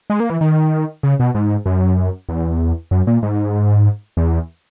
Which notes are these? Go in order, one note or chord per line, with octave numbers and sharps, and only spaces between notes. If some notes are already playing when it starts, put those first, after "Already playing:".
G#3
A#3
E3
D#3
C#3
B2
G#2
F#2
E2
F#2
A#2
G#2
E2